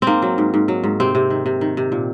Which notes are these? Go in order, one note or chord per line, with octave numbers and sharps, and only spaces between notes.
G#2 A#3 C4
F#3
G#2
G#2
F#3
G#2
C3 C4
C3
D#3
C3
D#3
C3
A#2